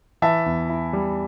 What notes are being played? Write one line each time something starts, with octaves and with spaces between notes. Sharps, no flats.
E3 E5 A5
E2
E4
G3